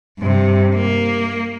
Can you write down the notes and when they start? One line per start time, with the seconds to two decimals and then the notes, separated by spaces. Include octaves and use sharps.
0.19 G2 C3
0.75 A#3